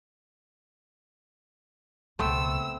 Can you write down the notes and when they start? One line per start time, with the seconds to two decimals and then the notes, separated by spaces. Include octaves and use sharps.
2.19 C#2 B2 A3 B3 C4 E6